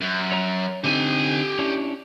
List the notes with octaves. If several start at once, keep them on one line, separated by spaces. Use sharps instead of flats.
F#2
C#5 A#5
D3 C4 D#4 G4 G#5
C#4 D4 E4